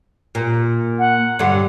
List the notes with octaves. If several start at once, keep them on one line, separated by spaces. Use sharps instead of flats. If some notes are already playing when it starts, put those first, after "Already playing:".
A#2
F#5
G2 D3